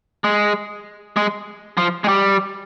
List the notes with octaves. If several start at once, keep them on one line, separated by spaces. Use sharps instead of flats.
G#3
G#3
F3
G#3
G3